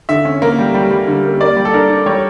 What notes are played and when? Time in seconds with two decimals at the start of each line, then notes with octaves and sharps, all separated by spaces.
0.09 D3 E5
0.25 C#4
0.42 A#3
0.59 G3
0.74 G3
0.91 G3
1.07 D3
1.24 A#3
1.41 A#3 D5
1.57 G3
1.65 A4
1.74 D4 A#4
1.90 D4
2.06 G3 C#5